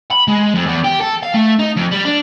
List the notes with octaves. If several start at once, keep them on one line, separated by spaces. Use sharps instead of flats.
B5
G#3
F2
E2
G4
A4
F5
A3
D#4
F2
G3
D4